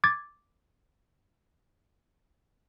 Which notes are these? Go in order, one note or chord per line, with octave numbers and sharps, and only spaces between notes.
D6 G#6 A6